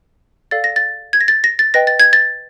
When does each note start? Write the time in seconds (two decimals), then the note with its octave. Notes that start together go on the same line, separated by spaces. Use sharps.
0.51 A4 D5 F5 A6
0.64 A#6
0.76 A6
1.13 G#6
1.21 A#6
1.28 A6
1.44 A#6
1.59 A6
1.74 B4 D#5 G5 A#6
1.87 A6
2.00 G#6
2.13 A6